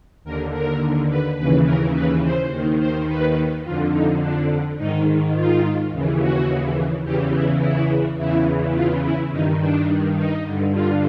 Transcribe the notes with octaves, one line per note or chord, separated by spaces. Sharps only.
D#2 D3 A#4
A#4
B4
D#2 C#3 E3 B4
A#4
B4
C5
D#2 D#3
C5
B4
F2 D3 F4
D#4
D4
G#2 D#3 D#4
F4
D#2 C#3 E3
F#4
E2 C#3 E3 G4
E4
E4
E2 C#3 E3 E4
F4
E4
G2 D#3 D#4
D4
D#4
G2 D3
F4